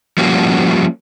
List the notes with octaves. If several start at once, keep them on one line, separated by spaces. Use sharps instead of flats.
F3 G3 A#3 C#4 F#4